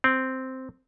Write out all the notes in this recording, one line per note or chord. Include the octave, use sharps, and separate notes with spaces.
C4